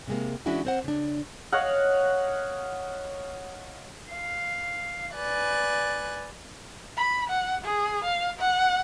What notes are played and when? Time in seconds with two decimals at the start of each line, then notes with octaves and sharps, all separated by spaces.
0.08 C3 G#3 A#3
0.46 E3 G#3 C#4 D4 E4 F#4
0.65 C4 C5 F#5
0.84 C#3 D4
1.52 C#5 D#5 F5 F#5
4.11 F5
5.15 B4 D5 G#5 F#6 A6
6.98 B5
7.29 F#5
7.65 G#4
8.04 F5
8.39 F#5